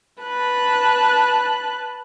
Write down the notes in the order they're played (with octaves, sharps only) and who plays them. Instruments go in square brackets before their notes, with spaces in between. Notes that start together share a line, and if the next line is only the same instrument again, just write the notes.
[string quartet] B4 A5 F#6